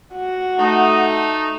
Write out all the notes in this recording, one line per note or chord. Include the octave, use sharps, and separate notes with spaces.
F#4
A3 D#4